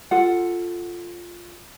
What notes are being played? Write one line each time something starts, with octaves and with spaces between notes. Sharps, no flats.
F4 A4 F#5